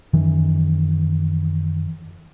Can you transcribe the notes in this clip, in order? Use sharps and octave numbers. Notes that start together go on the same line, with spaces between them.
F#2 D#3 E3